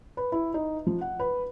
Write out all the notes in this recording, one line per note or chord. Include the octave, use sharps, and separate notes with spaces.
B4
E4
D#4
F3
F#5
B4